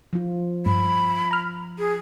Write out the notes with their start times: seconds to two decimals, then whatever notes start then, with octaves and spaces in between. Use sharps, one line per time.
0.13 F3 F4
0.66 G2 B5
1.31 A#5 F6
1.79 G#4